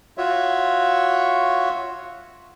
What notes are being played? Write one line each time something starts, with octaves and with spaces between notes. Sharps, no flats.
F4 F#4 C#5 E5